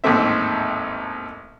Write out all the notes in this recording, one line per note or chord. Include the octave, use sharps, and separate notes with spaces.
A1 D#2 G#2 A3 C4 E5